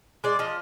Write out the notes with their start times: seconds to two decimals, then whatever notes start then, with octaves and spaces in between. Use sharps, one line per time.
0.24 G#3 D5
0.39 F3 D#5